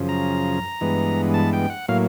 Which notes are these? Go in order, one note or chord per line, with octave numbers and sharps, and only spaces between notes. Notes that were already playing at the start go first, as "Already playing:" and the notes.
Already playing: F#2 C#3 F3
A#5
G2 E3 G#3 B3
A5
G5
F#5
A2 F#3 A#3 F5